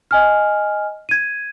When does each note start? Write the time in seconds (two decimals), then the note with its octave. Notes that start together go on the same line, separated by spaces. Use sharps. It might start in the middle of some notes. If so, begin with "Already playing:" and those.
0.11 D#5 G#5 F6
1.09 G#6 D#7